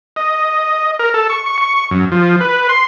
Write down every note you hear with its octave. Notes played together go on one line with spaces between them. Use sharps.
D#5
A#4
A4
C#6
C#6
C#6
F#2
F3
B4
C6